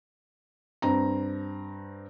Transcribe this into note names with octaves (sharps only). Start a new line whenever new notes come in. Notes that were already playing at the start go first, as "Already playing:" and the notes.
G2 C4 A#5